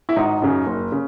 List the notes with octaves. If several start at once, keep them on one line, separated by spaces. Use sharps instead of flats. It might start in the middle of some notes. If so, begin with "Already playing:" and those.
E4
G#1 D#4
F#2 C#3
F#1
C#3